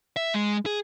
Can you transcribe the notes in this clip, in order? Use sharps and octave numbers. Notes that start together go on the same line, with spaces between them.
E5
G#3
G#4